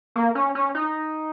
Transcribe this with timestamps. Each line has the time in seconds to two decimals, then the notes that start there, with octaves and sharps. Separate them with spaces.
0.16 A#3
0.35 C#4
0.55 C#4
0.75 D#4